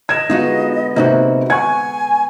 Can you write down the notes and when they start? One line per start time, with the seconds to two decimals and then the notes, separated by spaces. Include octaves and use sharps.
0.09 D#5 G#6 E7
0.30 D3 G#3 B3 D#4 F4 F#4
0.96 C3 A#3 C4 D#4 F#4
1.50 F#5 G#5 C#6 G#6